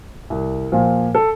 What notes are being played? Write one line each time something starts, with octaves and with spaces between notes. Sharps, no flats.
C2
A#2 F3
A4